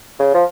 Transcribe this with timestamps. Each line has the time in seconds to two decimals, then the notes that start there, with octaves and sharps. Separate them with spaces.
0.20 C#3
0.34 F3